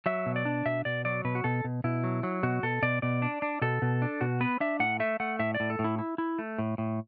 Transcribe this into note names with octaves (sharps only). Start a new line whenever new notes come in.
F#3 E5
B2
D5
D4
B2 E5
B2 D5
F#3 D5
B2 B4
F#4
B2 A4
B2
B2 E4
F#3
F#3
B2 F#4
B2 A4
B2 D5
B2 D5
D4
D4
B2 A4
B2
D4
B2 F#4
B3 B4
D4 E5
A2 F#5
A3 E5
A3 F#5
A2 E5
D5
A2
A4
A2
E4
E4
E4
A3
A2
A2